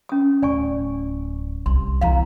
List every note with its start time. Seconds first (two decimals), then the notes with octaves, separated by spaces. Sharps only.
0.09 C#4 D#6
0.42 D1 D5 G#5 C#6
1.66 C2 C6
2.01 E2 E3 F5 A#5